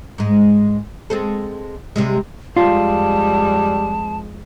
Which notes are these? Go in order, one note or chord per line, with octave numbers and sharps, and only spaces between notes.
G#2 G#3
G#3 C4 A4
C3 G3 G#3
F2 G3 G#3 F4 A5